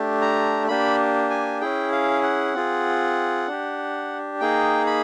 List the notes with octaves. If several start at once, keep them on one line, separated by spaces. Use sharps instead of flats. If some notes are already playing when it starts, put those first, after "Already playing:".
Already playing: A3 D4 G4
A#5
A#3 D4 G4 B5
G#5
C#4 E4 G#4 G5
F5
F#5
C4 F4 G#4
D4 G4
A#3 D#4 G#4 G5
B5